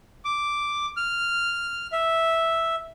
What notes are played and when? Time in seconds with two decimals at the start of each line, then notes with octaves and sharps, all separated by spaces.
0.25 D6
0.97 F6
1.92 E5